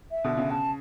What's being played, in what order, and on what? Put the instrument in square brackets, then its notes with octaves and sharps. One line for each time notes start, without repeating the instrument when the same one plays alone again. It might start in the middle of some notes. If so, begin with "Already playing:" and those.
[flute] E5
[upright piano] B2 D3
C#3
[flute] A5